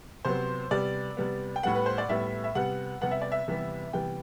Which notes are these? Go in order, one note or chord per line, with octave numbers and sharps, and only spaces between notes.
C3 F#3 B3 C5
C3 G3 B3 D5
C3 G3 B3
G5
A2 G3 B3 F#5
B4
C5
D5
A2 G3 B3 E5
E5
C3 G3 B3 F#5
C3 G3 B3 F#5
E5
D5
E5
C3 E3 G3 B3
C3 E3 G3 B3 G5